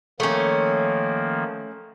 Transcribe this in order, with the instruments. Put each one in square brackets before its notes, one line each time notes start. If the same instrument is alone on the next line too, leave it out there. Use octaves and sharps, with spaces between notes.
[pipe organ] D#3 F3 A#3 [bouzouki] A3 C#4